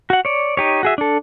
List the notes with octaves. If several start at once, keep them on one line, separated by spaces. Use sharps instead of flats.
F#4 F#5
C#5 D5
D#4 G4 C#5
F#4 G#4 E5
D4 A4